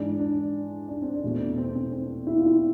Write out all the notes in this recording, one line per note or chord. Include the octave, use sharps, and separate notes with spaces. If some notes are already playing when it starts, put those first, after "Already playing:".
Already playing: G#2 E3 G#3 D4
D4
D4
C4
D4
E2 B2 A3
C4
C4
C4
E4
F4
E4